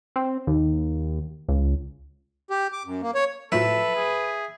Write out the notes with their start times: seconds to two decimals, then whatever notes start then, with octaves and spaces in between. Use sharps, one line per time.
0.16 C4
0.47 D#2
1.49 C#2
2.50 G4
2.73 D6
2.85 F#2
3.02 A#3
3.15 C#5
3.52 A2 F3 F#3 A4 B4 E5
3.95 G#4